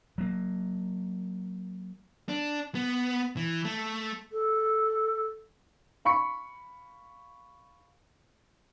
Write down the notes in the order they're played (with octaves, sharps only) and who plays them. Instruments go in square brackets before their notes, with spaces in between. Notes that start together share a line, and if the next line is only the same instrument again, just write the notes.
[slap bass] F#3 A#3
[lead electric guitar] D4
B3
E3
A3
[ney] A4
[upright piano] F5 B5 C#6 C#7